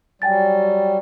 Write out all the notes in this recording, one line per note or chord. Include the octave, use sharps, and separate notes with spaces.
F#3 G3 G5 G#5 A6